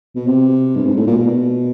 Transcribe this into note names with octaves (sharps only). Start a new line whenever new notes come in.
B2
C3
G2
G#2
A2
A#2
B2